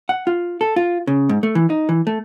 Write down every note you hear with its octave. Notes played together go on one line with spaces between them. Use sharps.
F#5
F4
A4
F4
C#3
G#2
A3
E3
D#4
E3
A3